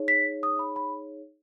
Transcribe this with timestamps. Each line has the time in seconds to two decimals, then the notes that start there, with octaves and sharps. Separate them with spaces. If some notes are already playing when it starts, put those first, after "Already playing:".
Already playing: D#4 G#4 C#5
0.08 B6
0.43 D#6
0.59 B5
0.76 B5